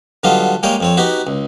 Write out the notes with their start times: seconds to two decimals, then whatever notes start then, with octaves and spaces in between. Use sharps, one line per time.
0.23 D3 F#3 G3 B3 F4 D#5
0.63 G3 G#3 A#3 C#5 D#5 G5
0.80 F2 C4 C#5
0.97 B3 D#4 F#4 G4
1.27 C#2